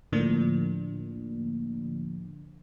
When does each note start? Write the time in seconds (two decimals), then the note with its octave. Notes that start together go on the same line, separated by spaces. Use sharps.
0.12 A2 D3 F3 A#3 D4